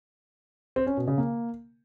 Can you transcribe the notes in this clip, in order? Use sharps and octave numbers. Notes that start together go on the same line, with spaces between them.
C4
C#4
B2
C#3
A#3